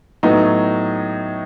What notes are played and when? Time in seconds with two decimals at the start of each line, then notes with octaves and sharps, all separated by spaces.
0.23 A2 F#3 B3 D#4